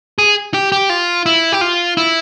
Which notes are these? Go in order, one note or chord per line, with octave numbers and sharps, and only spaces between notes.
G#4
G4
G4
F4
E4
G4
F4
E4